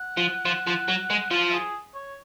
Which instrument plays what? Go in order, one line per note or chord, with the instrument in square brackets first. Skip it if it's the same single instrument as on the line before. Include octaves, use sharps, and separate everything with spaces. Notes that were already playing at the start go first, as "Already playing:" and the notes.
Already playing: [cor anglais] F#5
[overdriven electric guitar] F3
F3
F3
F#3
G#3
[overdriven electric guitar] F3 [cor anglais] F5
[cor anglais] G#4
C#5